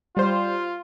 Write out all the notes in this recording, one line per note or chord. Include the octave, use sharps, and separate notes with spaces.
G3 F4 C5